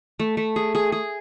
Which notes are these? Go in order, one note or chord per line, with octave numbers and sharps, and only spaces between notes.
A3
A3
G#4
G#4
G#4